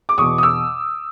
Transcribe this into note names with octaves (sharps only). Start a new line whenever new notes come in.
D6
E2 B2 C#6 D#6
D#6
D6 E6